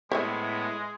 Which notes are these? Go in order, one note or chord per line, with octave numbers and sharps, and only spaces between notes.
A2 G#3 B3 E4 C5 C#5 E5